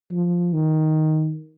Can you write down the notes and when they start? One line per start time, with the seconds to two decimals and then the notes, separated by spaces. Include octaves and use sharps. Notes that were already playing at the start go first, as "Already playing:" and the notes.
0.12 F3
0.53 D#3